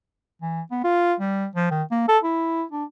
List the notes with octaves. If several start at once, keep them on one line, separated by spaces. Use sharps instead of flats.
E3
B3
F4
G3
F3
D#3
A#3
A4
E4
D4